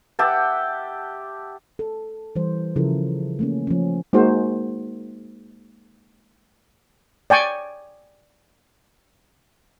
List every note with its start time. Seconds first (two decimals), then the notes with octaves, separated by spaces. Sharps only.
0.19 G4 E5 F#5 A5
1.79 A4
2.36 E3 G3 C5
2.76 C#3 F3 E4 F4 A4 A#4
3.39 A3 A#3 C#4
3.67 F3 C#4
4.13 G#3 A#3 D#4 F#4 C5
7.30 D5 G5 G#5 C#6